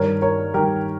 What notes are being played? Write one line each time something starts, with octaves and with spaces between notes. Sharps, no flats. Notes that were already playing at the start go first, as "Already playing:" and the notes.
Already playing: G2 D#3 A#4 C#5
A#4 C#5
G2 D#3 G4 A#4